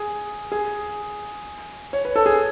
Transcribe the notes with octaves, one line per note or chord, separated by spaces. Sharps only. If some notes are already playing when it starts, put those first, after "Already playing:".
Already playing: G#4
G#4
C#5
B4
A4
G#4